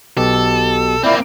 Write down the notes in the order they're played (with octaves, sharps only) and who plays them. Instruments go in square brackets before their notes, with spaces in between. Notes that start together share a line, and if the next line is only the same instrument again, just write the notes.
[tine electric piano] B1 B2 G4 [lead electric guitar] A4
[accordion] A#2 E4 D5 [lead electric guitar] A#3 C4